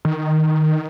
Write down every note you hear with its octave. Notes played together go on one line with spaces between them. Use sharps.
D#3